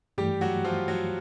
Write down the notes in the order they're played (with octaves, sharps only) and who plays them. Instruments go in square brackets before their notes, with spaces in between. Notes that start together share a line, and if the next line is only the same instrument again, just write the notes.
[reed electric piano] G2 E3 A3 [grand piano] G3 G4
[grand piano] F#3 F#4
F3 F4
F#3 F#4